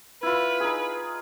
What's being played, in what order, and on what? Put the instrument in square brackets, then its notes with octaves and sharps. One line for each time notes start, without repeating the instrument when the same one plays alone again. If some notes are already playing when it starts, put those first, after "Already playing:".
[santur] E4 F4 [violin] B4
[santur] D#4 G#4